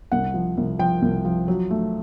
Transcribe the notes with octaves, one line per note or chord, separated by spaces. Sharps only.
C2 F#5
F3
C2
F3 G5
C2
F3
F#3
A3